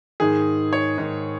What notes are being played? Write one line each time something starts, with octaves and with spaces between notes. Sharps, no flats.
G#2 D#3 G#4
C#5
G#2 D#3